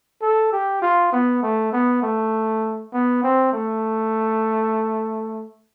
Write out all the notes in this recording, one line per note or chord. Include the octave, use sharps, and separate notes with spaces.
A4
G4
F4
B3
A3
B3
A3
B3
C4
A3